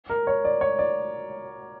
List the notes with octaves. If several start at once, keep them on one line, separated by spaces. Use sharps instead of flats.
A#4
C#5
D5
C#5
D5